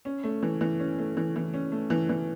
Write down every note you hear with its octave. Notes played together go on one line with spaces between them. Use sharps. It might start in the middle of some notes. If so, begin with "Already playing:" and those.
C#4
A3
E3
E3
C#4
A3
E3
E3
C#4
A3
E3
E3